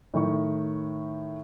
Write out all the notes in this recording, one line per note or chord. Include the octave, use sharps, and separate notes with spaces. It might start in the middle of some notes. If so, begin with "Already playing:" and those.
A2 D#3 C#6